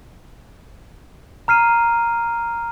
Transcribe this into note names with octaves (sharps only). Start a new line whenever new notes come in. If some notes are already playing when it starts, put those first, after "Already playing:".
A#5 F6 C7 D#7